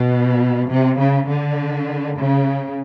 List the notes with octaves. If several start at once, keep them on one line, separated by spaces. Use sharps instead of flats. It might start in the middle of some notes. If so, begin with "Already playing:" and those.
Already playing: B2
C3
C#3
D3
C#3